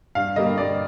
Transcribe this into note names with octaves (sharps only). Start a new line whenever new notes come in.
G2 F5
D3 G3 A#3 D#5
G2 D5